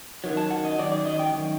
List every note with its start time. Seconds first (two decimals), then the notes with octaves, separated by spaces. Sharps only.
0.24 F#2 D#3 F#3
0.37 A5
0.51 F#5
0.65 D#5
0.79 F#2 D#3 F#3 D5
0.92 D5
1.05 D#5
1.19 G5
1.33 F#2 D#3